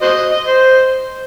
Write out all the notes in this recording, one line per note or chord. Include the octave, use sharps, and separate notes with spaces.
F#4 C5 D#5
D#5
C5